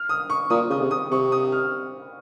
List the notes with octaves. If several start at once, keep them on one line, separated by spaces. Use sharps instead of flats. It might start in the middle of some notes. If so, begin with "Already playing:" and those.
Already playing: F6
D#6
C#6
A#2 D#6
C#3 D#6
C3
D#6
C3 C#6
D#6
F6